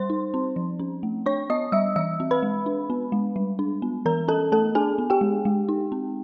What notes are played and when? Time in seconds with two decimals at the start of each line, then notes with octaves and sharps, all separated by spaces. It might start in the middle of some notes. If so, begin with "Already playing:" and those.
Already playing: G3 C5 C6
0.10 D#4
0.34 C4
0.56 F3
0.80 C#4
1.03 A3
1.26 D4 C#5 C#6
1.50 B3 D#5 D#6
1.72 G3 E5 E6
1.96 E3 E5 E6
2.20 C4
2.31 B4 B5
2.43 G#3
2.66 D4
2.90 B3
3.12 G#3
3.36 G3
3.59 D4
3.82 B3
4.06 E3 A#4 A#5
4.28 C#4 A4 A5
4.52 A3 A4 A5
4.75 D4 G#4 G#5
4.98 B3
5.10 G4 G5
5.21 G#3
5.45 G#3
5.69 D#4
5.92 C4